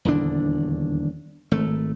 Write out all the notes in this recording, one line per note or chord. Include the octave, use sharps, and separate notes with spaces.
D#1 E2 D3 D4
G#1 A3